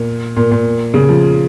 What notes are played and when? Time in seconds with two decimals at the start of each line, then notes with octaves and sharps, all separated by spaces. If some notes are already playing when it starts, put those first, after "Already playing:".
Already playing: A#2
0.36 A#2
0.51 A#2
0.94 C#3
1.09 F3